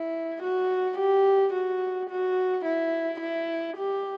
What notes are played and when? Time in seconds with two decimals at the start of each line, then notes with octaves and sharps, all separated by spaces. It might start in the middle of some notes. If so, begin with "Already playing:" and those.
Already playing: E4
0.42 F#4
0.98 G4
1.53 F#4
2.09 F#4
2.65 E4
3.20 E4
3.77 G4